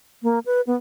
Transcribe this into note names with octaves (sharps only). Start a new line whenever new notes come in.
A#3
B4
B3